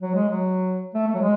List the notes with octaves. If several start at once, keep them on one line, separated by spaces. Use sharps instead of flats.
F#3
G#3
F#3
A3
A3
F#3
G#3